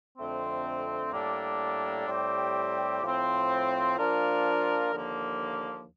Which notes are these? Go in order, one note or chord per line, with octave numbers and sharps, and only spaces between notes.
F2 D3 A3 C4
A2 G3 A#3 D4 A4
A2 G3 C4 G4
A2 F3 C4
F3 A#3 D4 F4 A#4
D#2 D3 F3 A#3